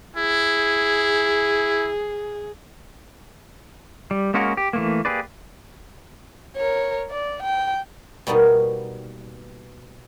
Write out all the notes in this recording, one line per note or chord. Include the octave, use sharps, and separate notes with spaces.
E4 G#4
G3
G#3 A#3 C#4 F#4 A#4
G4
E3 A3 A#3
A#3 G4 G#4 B4 D5
A#4 C#5
D5
G5
B2 G3 A#3 B3 D#4 F#4